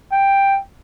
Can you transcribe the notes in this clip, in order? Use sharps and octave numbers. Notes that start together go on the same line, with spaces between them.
G5